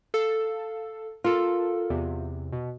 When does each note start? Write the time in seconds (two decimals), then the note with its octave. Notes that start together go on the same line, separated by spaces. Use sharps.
0.14 A4 F5
1.24 F4 A4 A#4
1.90 E2 C3
2.53 B2